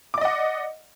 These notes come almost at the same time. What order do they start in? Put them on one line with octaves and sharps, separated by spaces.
D6 D5 D#5 F#5